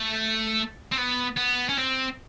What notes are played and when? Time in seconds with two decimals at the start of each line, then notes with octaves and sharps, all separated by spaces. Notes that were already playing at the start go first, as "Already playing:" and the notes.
Already playing: A3
0.92 C4
0.97 B3
1.37 B3
1.69 C#4
1.78 C4